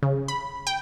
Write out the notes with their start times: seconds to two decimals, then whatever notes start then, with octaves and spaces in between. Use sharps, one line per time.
0.03 C#3
0.28 B5
0.67 G5